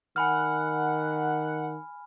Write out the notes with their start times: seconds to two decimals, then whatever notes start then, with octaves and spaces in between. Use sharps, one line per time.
0.16 D#3 F#5 G#5 B5 F6